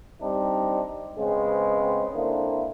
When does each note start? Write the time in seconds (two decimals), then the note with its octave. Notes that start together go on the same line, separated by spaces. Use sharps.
0.22 G3 C4 D4 D#4
1.17 C#3 G#3 B3 C4
2.14 D3 A#3 C4 D4 E4